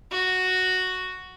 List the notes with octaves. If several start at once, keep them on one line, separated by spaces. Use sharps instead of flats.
F#4